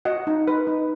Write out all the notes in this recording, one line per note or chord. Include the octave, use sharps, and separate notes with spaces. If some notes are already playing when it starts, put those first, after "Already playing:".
F#4 D#5 F#5
D#4
B4
D#4